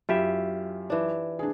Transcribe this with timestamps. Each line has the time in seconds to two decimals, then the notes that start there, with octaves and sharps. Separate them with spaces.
0.09 F#2 E4 F4 G4 E5
0.90 E3 D4
1.39 D4 G#4